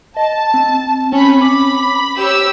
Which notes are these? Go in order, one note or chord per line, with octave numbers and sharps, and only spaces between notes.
D#5 A5
C4
C4 C#4 B5
B5 D6
G4 C#5 E6